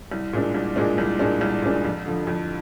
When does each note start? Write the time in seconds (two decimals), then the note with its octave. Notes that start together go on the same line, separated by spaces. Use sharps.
0.12 C2
0.33 A#2 G#3 D4
0.54 C2
0.76 A#2 G#3 D4
0.98 C2
1.19 A#2 G#3 D4
1.41 C2
1.62 A#2 G#3 D4
1.84 F2
2.06 D3 F3
2.27 F2